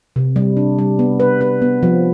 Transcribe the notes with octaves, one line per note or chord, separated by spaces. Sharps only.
C3
G3
D4
G3
B3
B4
B4
B3
F3